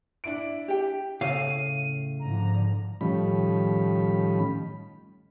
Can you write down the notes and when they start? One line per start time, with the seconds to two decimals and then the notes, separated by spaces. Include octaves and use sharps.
0.24 D4 E4 D7
0.68 G4 G5
1.21 A2 C#3 F5 D#7
2.20 G#2 D3 F3 A#5
3.01 A2 D#3 F3 G3 C#4 B5